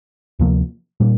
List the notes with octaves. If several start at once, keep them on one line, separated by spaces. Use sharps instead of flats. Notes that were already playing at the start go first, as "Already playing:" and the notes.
D2 C3 F3 A#3
A#2 G3 A#3